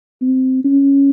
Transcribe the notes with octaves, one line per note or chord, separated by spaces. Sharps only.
C4
C#4